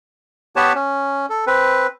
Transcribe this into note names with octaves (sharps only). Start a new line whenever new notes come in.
B3 G4 B4 C#5 A5
C#4
A4
C4 B4